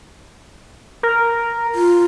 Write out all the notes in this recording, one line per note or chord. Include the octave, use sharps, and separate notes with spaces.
A#4
F4